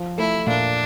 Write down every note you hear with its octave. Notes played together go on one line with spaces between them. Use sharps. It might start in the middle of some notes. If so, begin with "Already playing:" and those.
Already playing: F3
A3 E4
A#2 D4